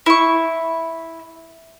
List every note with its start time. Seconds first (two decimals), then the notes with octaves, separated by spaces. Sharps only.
0.06 E4 C#6